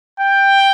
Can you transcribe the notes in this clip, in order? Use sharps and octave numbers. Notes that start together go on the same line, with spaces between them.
G5